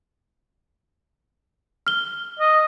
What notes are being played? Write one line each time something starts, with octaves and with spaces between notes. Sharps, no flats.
F6 G7
D#5